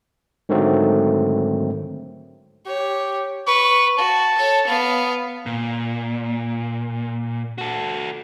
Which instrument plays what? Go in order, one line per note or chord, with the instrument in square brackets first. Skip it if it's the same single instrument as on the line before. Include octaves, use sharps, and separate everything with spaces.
[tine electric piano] G#2 D3 D#3 F#3 A3 C4
[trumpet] G4 [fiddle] C#5
[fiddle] B4 [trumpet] C#6
[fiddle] F#4 [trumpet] A5
[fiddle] A4 C#5
B3 F5
[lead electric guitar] A#2
F#4 A4